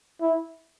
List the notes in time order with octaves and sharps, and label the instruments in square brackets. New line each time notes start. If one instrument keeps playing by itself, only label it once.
[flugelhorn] E4